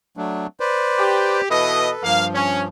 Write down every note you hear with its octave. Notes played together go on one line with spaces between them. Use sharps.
F#3 A3 D4
B4 C5 D5
G4
B2 E3 A4 B4 D#5
G2 F3 A#3 F5
C#4